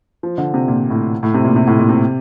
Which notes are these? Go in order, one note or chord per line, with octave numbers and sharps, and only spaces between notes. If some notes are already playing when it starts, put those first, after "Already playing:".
F3
D3
C3
A#2
A2
A2
C3
A#2
C3
A2
A#2
C3